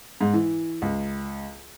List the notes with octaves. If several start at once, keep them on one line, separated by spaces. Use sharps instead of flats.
G#2
E3
C#2